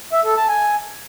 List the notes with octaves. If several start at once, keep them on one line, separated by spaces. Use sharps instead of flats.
E5
A4
A5
G#5